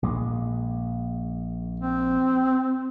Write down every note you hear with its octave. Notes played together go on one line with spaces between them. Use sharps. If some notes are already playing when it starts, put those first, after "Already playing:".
A#1 A#2 G#3
C4